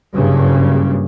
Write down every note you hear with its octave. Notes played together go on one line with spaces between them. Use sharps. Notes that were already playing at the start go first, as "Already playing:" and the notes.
F#1 G2 C#3